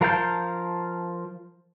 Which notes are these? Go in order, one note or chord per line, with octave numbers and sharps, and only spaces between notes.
F3 A#4 F5 A5 G6